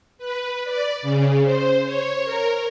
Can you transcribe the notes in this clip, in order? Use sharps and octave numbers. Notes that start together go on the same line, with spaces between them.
B4
D5
C#3
C5
C#5
A#4